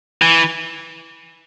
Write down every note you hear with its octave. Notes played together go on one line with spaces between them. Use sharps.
E3